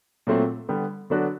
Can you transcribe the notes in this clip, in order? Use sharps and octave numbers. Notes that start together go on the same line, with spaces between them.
A#2 F#3 A3 C4
D3 G3 B3
D3 F#3 B3 D4 F#4